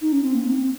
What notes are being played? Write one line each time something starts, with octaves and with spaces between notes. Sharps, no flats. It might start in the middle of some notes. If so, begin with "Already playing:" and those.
D#4
C#4
C4
A#3
C4